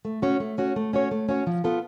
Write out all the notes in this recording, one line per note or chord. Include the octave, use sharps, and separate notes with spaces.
A3
C#4 F#4 C#5
A3
C#4 F#4 C#5
A3
C#4 F#4 C#5
A3
C#4 F#4 C#5
F3
B3 F4 A4